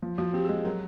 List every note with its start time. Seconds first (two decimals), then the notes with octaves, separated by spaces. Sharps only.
0.02 F3
0.18 F3 F#4
0.33 C4 G4
0.45 G#4
0.49 G#3
0.64 F#3 A#4